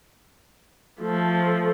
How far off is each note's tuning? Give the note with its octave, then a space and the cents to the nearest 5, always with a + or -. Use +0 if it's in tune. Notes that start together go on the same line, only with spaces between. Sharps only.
F3 +0 A3 +0